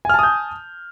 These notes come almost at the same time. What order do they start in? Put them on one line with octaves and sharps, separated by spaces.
G#5 F6 A5 D#6 G6